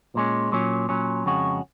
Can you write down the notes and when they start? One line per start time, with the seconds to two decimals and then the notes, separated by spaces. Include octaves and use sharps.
0.15 A#2 G#3 C#4
0.52 A#2 F#3 C#4
0.89 A#2 F#3 C#4
1.26 F2 C#3 G#3 C#4 F#4